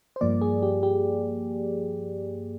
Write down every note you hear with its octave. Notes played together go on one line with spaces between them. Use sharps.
C5
G2 F3 A#3 D5
G#4
G4
G4